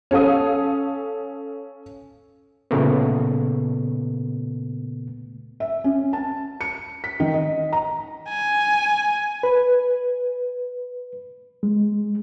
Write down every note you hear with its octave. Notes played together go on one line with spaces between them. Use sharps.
C#4 A4 F5 D#6
A#2 C#3 A3 B3
E5
C#4
A5
C#7
B6
D#3
D#5
A#5
G#5
B4
G#3